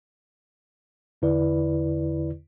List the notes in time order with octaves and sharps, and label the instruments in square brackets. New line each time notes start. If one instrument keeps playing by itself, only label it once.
[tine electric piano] E2 D3 E4 B4 D5